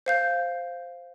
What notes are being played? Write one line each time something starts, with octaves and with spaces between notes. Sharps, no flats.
C5 F5 G6